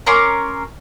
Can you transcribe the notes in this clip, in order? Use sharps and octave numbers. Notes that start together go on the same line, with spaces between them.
C#4 A#4 C6 D6